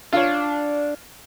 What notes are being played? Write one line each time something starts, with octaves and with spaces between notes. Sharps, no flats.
D4 F4 C#5